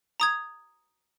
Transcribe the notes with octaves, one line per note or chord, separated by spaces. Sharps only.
A#5 D#6 G#6